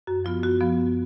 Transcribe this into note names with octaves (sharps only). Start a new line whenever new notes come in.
F#2 F#4
F3 B3 F4
F#2 F#4
F3 B3
F#2